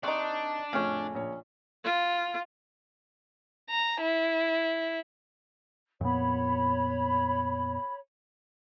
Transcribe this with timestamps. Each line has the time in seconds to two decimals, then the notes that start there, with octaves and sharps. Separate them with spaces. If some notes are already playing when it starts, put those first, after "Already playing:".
0.03 C3 D4 D#4 C6 C#6 F#6
0.73 F2 A2 C#3 A3 C#4
1.15 A#1 C#5
1.84 F4
3.70 A#5
4.01 E4
6.01 F2 A#2 B3 C#5 B5